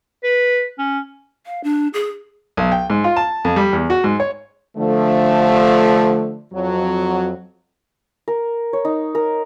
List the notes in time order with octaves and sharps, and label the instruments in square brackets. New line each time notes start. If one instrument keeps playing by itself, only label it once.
[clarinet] B4
C#4
[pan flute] F5
D4
G#4
[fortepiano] B1
G5
G#2
F4
A5
F2
G3
E2
F#4
G#2
C#5
[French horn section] D3 F3 A3
F2 F#3
[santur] A#4
C#5
D#4
A#4